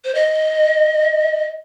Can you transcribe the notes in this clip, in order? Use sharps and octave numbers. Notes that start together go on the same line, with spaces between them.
C5
D#5